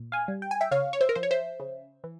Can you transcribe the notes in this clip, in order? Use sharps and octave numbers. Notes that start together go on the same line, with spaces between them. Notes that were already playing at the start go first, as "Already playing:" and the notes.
Already playing: A#2
F5 G#5
G3
G5
G#5
E5 G5
C#3 C#5 F5
C#5
C5 E5
A#4
F3 C5
C#5
C5 E5
C#3
E3